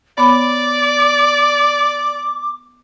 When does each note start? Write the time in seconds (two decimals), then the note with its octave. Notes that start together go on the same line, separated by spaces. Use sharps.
0.18 B3 C#5 D5 B5 D6